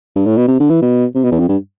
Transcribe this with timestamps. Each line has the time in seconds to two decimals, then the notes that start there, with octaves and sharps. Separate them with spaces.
0.16 G2
0.26 A2
0.37 B2
0.48 C3
0.60 D3
0.70 E3
0.82 B2
1.15 C3
1.24 B2
1.32 E2
1.39 F2
1.49 G2